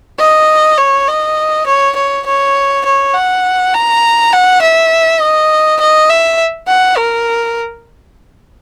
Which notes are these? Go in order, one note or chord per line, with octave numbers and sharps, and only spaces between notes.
D#5
C#5
D#5
C#5
C#5
C#5
C#5
F#5
A#5
F#5
E5
D#5
D#5
E5
F#5
A#4